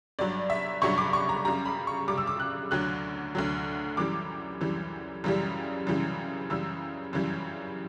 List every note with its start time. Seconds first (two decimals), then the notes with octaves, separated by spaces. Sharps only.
0.19 G1 G2 F#3 D5
0.50 E5
0.82 G1 G2 F#3 C#6
0.98 D6
1.13 C#6
1.29 A#5
1.45 F#2 C#3 G3 A#5
1.65 B5
1.87 C#6
2.08 F#2 C#3 G3 D6
2.18 E6
2.27 D6
2.40 F#6
2.71 D2 D3 F#3 F#6
3.35 D2 D3 F#3
3.97 F#2 E3 G3 D6
4.61 F#2 E3 G3
5.24 F#2 C#3 E3 G3
5.87 F#2 C#3 E3 G3
6.50 F#2 C#3 E3 G3 E6
7.13 F#2 C#3 E3 G3